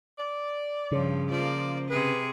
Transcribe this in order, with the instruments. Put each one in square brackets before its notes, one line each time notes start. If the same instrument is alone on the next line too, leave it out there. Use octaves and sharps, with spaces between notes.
[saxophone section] D5
[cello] G2 F3 [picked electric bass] C#3
[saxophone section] F3 [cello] A#3 D5
[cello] C3 G#4 [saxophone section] B4